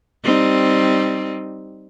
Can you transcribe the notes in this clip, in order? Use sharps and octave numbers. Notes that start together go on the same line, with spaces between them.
G3 C4 D#4